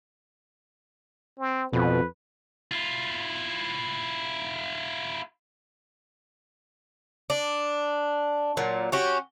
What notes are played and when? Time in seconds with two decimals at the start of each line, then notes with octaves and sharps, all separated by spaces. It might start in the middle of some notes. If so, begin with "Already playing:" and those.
1.39 C4
1.73 F2 B2 B4
2.71 E4 F4
7.30 D4
8.57 A#2 F#3
8.92 C#4 F#4 G4